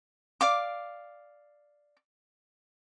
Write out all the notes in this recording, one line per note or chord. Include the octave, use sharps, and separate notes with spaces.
D5 F5 D6